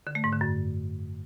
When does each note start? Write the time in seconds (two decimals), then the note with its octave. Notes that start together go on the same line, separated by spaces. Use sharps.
0.07 D3
0.15 A3
0.24 G#2
0.32 D3
0.41 F#2